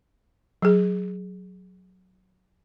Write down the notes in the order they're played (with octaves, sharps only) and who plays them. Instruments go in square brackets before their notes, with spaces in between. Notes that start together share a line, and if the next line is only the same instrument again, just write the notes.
[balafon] F#3 G#4